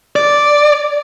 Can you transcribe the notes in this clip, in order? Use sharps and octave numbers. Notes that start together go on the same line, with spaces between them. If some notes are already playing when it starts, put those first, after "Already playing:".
D5